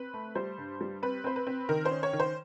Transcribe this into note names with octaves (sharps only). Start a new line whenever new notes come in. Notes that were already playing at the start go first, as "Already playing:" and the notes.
Already playing: C4 B4
A3
G3 C5
G2
G3
C4 B4
C4 C5
B4
C4
D#3 A#4
C5
C#4
C#5
D#3
C5